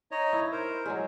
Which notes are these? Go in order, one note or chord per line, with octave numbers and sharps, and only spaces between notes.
D#4 C#5 D#5
E4
A#4 C5
F#3 G#3 G#4